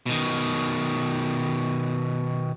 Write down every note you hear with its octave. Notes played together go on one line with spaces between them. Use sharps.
B2 D#3